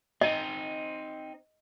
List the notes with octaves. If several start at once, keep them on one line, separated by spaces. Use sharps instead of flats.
C4 D#4 D#5